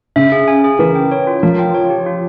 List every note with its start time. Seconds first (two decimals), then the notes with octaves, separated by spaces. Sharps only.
0.16 C#3 E5
0.32 G#4
0.48 G#5
0.64 G#4
0.79 E3 A#4
0.95 G5
1.11 C#5
1.27 F4
1.43 F3 A#4
1.59 G5
1.74 C#5
1.90 G4
2.06 F4